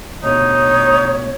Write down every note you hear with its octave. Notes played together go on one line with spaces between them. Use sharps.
D2 B2 D#4 C#5